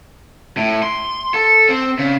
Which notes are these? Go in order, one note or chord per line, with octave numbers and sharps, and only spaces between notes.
A2
C6
A4
C4
C#3